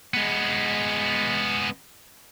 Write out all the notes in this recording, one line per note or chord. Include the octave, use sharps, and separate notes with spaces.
G#3 B3